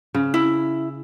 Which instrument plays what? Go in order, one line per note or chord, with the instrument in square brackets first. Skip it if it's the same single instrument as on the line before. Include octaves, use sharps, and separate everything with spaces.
[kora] C#3
[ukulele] E4